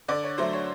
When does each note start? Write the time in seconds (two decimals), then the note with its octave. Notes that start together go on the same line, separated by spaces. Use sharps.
0.08 D3 D5
0.23 C#5
0.38 F#3 A3 C5
0.53 C#5